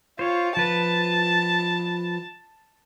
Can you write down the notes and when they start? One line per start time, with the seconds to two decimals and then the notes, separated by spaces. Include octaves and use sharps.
0.19 F4 C5 C#5
0.57 F3 B4 A5